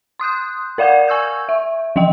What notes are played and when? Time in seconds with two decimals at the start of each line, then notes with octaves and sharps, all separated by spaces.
0.20 C6 D#6 F#6 G6
0.78 A#4 D5 F5 F#5 G6 G#6
1.08 G#5 C#6 E6 G6 G#6
1.49 E5
1.96 E3 F3 D#5 G5